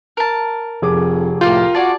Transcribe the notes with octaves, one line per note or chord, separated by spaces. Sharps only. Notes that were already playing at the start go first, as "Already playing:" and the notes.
A#4 A5
F1 F2 G#4 D6
A2 A#3 F4 F5 G5
F#4 G#4 D5 A5